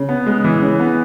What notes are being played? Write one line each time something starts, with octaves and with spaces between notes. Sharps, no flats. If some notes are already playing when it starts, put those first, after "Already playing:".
Already playing: C#3
B3
G#3
E3
C#3
B3